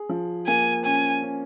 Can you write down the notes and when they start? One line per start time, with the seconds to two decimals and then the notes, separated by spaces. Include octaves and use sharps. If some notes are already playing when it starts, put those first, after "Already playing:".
Already playing: G#4
0.09 F3
0.47 A#3 G#5
0.85 C#4 G#5
1.23 C#4